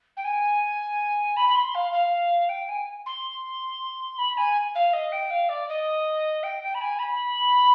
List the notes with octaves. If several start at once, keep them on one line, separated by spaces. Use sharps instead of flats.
G5
G#5
B5
B5
C6
F5
F5
G5
G#5
C6
B5
G#5
F5
D#5
G5
F5
D5
D#5
G5
G5
B5
G#5
B5